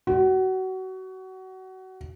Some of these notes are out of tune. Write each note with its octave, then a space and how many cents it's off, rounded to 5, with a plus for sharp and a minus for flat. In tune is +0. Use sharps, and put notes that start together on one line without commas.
F#4 +25